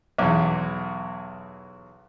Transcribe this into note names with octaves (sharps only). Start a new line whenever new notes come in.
B1 E2